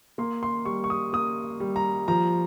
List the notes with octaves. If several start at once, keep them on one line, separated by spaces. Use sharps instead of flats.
A#3 C6
C6
G3 C#6
C#6
D#6
A#3 D#6
G3
A#5
F3 A#5